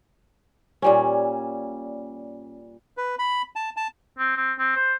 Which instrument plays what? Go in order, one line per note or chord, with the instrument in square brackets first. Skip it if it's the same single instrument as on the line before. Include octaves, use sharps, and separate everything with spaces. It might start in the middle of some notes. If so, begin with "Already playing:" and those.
[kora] A#2 G3 C#4
[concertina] B4
B5
A5
A5
[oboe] C4
C4
C4
C5